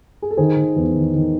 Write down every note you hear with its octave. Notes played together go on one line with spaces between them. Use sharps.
G#4
A4
D#3 G#4 C5
D#3
E2
D#3
D#3